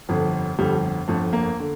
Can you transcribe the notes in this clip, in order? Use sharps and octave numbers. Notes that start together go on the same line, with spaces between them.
G1 F2 D3
G1 F2 D3 G3
G1 F2 D3 A3
A#3
D3